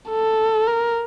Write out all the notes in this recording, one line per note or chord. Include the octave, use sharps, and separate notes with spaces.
A4
A#4